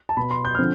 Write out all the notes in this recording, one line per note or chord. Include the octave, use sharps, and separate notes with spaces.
A5
B2 B3 B5
C6
G6
D3 F3 C4 F6